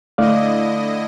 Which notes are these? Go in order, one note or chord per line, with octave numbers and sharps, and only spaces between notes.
D3 A3 E4 D5 D#5 F5